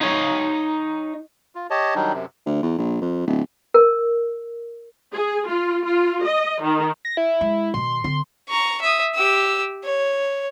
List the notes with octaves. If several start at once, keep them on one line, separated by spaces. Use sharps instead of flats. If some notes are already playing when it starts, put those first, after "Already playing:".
D#4 C#5
F4
G4 C#5 D#5 A5
D#3 F#3 G3 D4 D#4
F#2 C3
D2
E2
A#1
F2
D1
A#4
G#4
F4
F4
D#5
D#3
A#6
E4
G#3
B2 D#3 C6
D3 C4 C6
A#5 C#6
E5 D#6
G4 E6
C#5